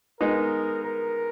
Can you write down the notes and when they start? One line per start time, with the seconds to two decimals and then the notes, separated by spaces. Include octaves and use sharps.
0.20 G#3 B3 D#4 A#4
0.84 A#4